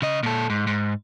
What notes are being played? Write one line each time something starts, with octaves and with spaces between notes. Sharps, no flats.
C#3 D#5
A#2 A4
G#2
G#2